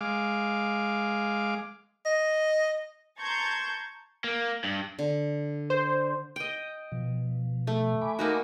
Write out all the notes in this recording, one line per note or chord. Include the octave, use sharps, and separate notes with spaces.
G#3 F5 D6
D#5
A5 A#5 C6 C#6 G6 G#6
A#3
G2
D3
C5
D#5 G5
B2 F3
A3
G#5 B5 D6
A#3 D#4 F#4